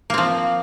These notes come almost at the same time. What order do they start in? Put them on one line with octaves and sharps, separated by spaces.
A#3 C4 F3